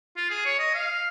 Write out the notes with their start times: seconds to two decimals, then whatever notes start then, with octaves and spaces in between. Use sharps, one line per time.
0.17 F4
0.30 G#4
0.45 C#5
0.59 D#5
0.74 F5